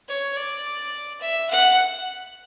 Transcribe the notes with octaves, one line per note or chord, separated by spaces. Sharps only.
C#5
D5
E5
F#5